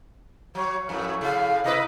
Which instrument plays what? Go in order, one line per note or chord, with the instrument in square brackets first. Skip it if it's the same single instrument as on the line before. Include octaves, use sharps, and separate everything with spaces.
[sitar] F#3 [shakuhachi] C#5
[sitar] F2 A2
[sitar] A2 C#3 [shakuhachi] F5
[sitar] C3 E4 B4 [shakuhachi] D#5